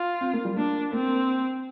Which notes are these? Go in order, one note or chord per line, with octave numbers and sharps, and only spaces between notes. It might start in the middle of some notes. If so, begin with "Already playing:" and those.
Already playing: F4
C4
A#3
G3
A#3 D4
A#3 C4